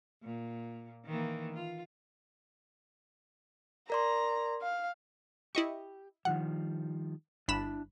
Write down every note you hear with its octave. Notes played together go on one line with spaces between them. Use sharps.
A#2
D#3 E3 A#3
F4
A#4 D5 A#5 C6
F5
E4 G4 D#5 C#6
D#3 F3 G3 F#5
G1 D4 E4 A5 B5 E7